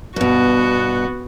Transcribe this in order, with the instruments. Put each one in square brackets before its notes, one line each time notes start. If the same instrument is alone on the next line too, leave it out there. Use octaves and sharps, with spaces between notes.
[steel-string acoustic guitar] G2 B2 [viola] B3 F#4